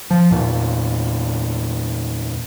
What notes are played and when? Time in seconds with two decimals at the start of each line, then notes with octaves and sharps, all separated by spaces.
0.11 F3
0.31 E2 A#2